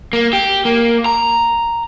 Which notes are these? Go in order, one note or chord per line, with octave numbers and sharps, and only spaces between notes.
A#3
G4
A#3
A#5